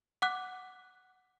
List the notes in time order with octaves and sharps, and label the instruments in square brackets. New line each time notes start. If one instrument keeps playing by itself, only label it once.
[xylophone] F#5 D6 F#6